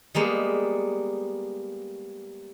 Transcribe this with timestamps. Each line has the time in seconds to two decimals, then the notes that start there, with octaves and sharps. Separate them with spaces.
0.15 G3 G#3 A#3 B3